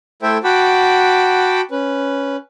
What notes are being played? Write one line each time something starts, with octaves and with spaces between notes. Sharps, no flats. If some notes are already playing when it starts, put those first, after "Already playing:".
A3 E4 A4 C5 E5 G5
F#4 F#5 G5 A5 B5 D6
C#4 B4